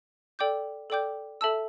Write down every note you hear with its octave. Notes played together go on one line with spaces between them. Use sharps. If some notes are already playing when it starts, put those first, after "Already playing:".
A4 D5 G5 D6 G6
A4 D5 G5 D6 G6
A4 E5 A5 E6